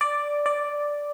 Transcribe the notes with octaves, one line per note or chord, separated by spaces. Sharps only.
D5
D5